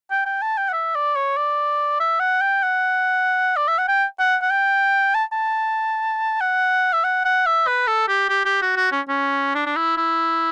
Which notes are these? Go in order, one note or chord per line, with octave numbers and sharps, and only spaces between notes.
G5
G5
A5
G5
F#5
E5
D5
C#5
D5
E5
F#5
G5
F#5
D5
E5
F#5
G5
F#5
F#5
G5
A5
A5
F#5
E5
F#5
F#5
E5
B4
A4
G4
G4
G4
F#4
F#4
C#4
C#4
D4
D4
E4
E4